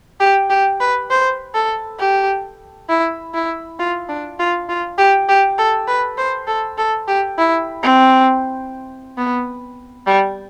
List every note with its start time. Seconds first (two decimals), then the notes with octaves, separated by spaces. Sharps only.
0.20 G4
0.50 G4
0.80 B4
1.11 C5
1.55 A4
1.99 G4
2.89 E4
3.34 E4
3.79 F4
4.09 D4
4.39 F4
4.69 F4
4.98 G4
5.29 G4
5.58 A4
5.88 B4
6.18 C5
6.47 A4
6.78 A4
7.08 G4
7.38 E4
7.83 C4
9.17 B3
10.07 G3